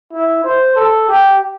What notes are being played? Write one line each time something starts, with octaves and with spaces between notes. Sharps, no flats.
E4
C5
A4
G4